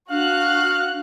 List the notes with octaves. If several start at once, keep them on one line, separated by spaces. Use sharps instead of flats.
D4 F#4 F5 F#6